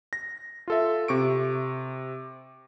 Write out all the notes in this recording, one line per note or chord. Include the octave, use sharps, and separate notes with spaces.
A#6
F4 A4 E5
C3 C#6 D7